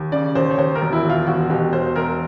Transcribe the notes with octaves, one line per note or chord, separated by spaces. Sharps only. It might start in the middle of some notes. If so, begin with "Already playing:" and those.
Already playing: D#2
C#3 D5
D#2 C5
C#5
D#2 C5
A#4
E1
E4
D#2 F4
E1 F#4
B2 G4
E1 C5
E1 A#4